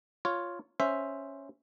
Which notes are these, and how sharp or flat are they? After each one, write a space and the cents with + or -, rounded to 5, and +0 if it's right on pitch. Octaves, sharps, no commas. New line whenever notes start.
F4 +0 C#5 +0
C#4 +0 C5 +0 E5 +0